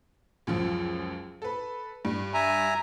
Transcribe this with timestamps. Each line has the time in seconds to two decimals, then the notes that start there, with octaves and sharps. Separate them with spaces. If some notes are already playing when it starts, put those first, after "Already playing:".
0.47 C#2 F#2 F3
1.42 A4 B4
2.05 G2
2.34 E5 G#5 A#5